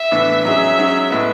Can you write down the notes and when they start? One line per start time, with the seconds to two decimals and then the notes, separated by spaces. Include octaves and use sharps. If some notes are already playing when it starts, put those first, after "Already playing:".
Already playing: E5
0.11 A2 E3 B3 D4
0.44 G#2 F#3 C#4 G#4 E5
0.78 G#2 F#3 C#4 G#4
1.10 A2 G#3 B3